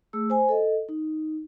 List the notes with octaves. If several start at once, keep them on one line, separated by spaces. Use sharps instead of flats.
A3 G#4 E6
C5 G#5
A4 D#5
D#4